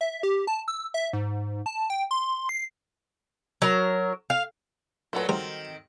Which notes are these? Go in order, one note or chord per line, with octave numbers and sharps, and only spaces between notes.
E5
G4
A5
E6
E5
G#2
A5
G5
C6
C7
F#3 A#4
F5
A#2 F#3 A3 F4 B4
D#3 F#3 G3 C4 C5